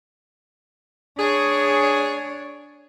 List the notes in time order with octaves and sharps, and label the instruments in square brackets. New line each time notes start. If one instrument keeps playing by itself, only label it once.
[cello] D4 C#5 [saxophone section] G#4